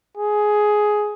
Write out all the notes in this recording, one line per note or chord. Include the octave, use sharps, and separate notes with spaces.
G#4